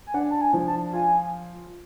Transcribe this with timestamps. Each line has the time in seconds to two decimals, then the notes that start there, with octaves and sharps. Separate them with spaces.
0.07 G#5
0.14 D4 F#5
0.30 A5
0.41 G#5
0.53 F3
0.67 A5
0.93 F4 G#5